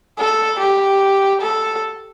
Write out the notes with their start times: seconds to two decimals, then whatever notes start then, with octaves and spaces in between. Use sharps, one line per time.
0.18 A4
0.59 G4
1.41 A4